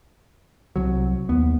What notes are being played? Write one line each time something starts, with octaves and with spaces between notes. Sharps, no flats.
C2 F#3
D#2 B3